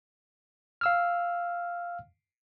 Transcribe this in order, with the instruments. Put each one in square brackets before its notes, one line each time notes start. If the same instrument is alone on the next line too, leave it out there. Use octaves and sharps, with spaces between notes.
[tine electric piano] F5 E6 F6